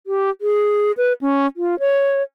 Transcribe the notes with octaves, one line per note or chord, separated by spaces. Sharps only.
G4
G#4
B4
C#4
F4
C#5